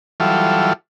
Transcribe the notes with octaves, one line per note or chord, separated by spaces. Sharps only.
E3 F#3 G3 F4 A4